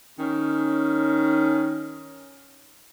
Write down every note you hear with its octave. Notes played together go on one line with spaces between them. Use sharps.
D#3 C#4